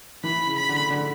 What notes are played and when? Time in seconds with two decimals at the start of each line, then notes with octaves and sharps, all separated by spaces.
0.24 E3 B5
0.47 C#3
0.57 B5
0.69 D3
0.90 D3